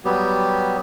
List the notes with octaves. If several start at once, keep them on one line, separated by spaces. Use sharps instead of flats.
F#3 G3 B3 G4